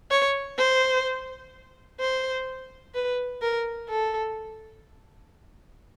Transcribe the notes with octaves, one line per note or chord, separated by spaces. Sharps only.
C#5
C5
C5
B4
A#4
A4